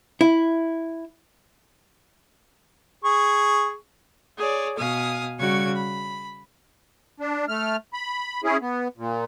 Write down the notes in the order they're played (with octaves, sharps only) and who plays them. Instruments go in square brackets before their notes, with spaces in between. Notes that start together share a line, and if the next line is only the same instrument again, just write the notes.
[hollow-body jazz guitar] E4
[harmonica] G#4 C#6
[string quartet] G#4 C#5 D5
B2 F5 G#5 D#6
C#3 G3 F#4 C#6 G#6
B5
[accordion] D4
A3 F6
B5
C#4 E4 G#4
B3
A#2